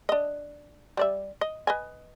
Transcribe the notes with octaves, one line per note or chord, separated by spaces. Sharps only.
D4 D#5
G3 D5 E5
D#5
B4 D#5 G#5